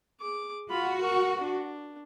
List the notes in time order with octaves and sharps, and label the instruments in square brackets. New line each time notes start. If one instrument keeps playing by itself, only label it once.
[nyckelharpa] G#4 D6
[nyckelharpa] F4 B5 [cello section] F#4
[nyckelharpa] A#4 C#6
D4